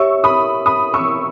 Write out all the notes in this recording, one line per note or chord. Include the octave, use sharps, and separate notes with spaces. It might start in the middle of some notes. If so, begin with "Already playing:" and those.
Already playing: G4 C#5 E5 C#6 E6
B5 D#6
B5 D#6
C#6 E6